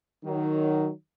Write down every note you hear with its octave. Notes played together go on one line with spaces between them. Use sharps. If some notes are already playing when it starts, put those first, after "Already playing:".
D#3 F#3